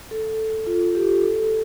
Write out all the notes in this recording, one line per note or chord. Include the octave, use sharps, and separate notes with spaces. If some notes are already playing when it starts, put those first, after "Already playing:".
A4
F4
G4
A4